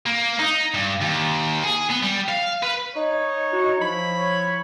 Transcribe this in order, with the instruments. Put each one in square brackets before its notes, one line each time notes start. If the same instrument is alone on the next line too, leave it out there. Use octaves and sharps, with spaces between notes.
[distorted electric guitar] A#3
D#4
G2
D#2
G#4
B3
G3
F5
B4
[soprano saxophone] D#4 [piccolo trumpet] C#5
[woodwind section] E4 F#4
[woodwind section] F3 E4 [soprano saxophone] B5
[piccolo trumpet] C#5